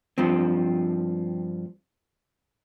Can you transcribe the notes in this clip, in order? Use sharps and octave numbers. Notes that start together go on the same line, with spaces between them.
G2 F3 C4